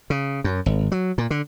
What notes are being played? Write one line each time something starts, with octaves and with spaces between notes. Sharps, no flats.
C#3
F#2
G#1
F#3
A#2
D3